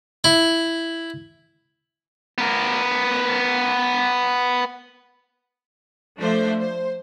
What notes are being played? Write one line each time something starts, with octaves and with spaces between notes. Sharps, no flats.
E4
B3 A#4
F3 A3 D4 C5 E5
C5